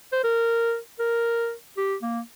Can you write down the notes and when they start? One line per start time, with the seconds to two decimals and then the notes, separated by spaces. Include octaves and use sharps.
0.13 C5
0.24 A#4
1.00 A#4
1.77 G4
2.02 A#3